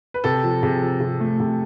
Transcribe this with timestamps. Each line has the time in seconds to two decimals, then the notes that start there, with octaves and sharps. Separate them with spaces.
0.14 B4
0.24 C3 A4
0.43 F3
0.63 C3 G#4
0.81 F3
1.01 C3
1.20 A3
1.40 C3